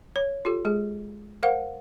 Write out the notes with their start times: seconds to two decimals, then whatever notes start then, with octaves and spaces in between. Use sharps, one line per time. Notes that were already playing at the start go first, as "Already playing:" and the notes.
0.16 C#5
0.45 F4 G4 A4
0.65 G#3 G#4
1.43 A#4 C5 F5 F#5